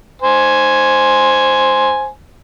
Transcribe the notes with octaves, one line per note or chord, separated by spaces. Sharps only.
C5 G#5